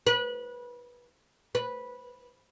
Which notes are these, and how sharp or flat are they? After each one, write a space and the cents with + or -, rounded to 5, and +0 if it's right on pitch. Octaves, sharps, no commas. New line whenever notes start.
B4 -25
B4 -10